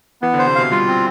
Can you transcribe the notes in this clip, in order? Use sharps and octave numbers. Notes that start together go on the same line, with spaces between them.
E3 B3
D3 C5
C3
B2 F5
G3 F4
C4